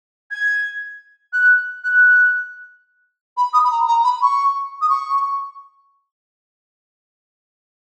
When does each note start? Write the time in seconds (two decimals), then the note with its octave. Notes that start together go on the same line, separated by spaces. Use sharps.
0.31 G#6
1.33 F#6
1.84 F#6
3.37 B5
3.53 D#6
3.64 B5
3.71 A#5
3.87 A#5
4.04 B5
4.22 C#6
4.81 D#6
4.89 C#6